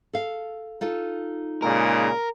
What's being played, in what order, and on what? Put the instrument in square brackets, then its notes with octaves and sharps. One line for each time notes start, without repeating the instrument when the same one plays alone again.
[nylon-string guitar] A4 F5
D#4 F4 A4
[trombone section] A#2 C#3 G#3 [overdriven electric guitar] A#4